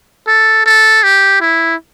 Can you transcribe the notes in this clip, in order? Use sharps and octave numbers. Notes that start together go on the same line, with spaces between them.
A4
A4
G4
E4